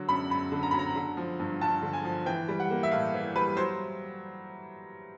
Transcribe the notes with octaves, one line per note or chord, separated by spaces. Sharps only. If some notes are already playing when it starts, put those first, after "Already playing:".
Already playing: D3 F#3
F#2 B5
F#2 B5
D3
A#5
F#3 B5
A#5
D3
F3
G2
G2 A5
D3
G#5
F3
E3 G5
G3
F#5
A#3
E5
A2 F5
E3
G3 B4
F#3 C5